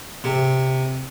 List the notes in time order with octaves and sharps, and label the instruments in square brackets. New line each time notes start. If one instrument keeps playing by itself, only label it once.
[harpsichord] C3